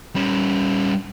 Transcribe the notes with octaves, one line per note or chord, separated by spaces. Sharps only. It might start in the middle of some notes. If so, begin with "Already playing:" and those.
G3 C#4